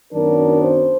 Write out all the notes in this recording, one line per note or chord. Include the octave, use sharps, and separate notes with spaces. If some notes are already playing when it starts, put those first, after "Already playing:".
F#2 D#3 F#3 B3 D4 A#4
C5